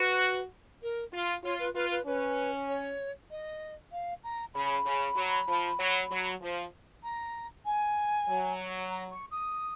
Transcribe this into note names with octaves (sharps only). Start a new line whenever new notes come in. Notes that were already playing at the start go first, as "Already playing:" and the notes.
Already playing: F#4 B4
A#4
F4
F4 C#5
B4
F4 B4
B4
C#4 B4
C#5
D#5
F5
A#5
C#3 B5
C#3
F#3
F3
F#3
F#3
F3
A#5
G#5
F#3
A#5
C#6
D#6